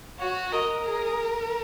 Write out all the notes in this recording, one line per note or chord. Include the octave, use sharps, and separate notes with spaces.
F#4 C#5
A#4 D#5
G#4